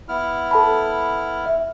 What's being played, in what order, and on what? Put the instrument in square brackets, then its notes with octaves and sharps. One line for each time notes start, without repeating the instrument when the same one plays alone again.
[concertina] B3 E4 F6
[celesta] A4 A5 B5
E5